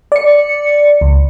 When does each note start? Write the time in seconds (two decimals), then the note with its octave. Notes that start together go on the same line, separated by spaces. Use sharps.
0.12 D5 C#7
1.01 C#2